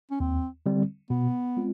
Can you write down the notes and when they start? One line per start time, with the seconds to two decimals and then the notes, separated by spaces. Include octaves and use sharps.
0.11 C#4
0.20 D#2 C4
0.66 D3 G3 C4
1.10 B2 B3
1.57 G#3 C4 F4